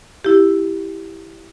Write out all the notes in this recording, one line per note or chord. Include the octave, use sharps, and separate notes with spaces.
E4 G4